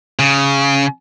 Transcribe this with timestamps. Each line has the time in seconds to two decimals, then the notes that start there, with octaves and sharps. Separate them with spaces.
0.19 C#3